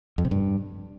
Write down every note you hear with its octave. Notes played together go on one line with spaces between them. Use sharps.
F2
C3
G2